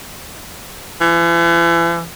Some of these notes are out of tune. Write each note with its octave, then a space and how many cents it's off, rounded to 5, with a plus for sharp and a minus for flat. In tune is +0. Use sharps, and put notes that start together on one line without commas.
E3 +40